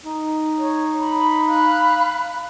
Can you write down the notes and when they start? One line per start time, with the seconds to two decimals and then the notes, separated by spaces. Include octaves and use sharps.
0.05 D#4
0.59 C#5
0.98 B5
1.48 F5 B5 F#6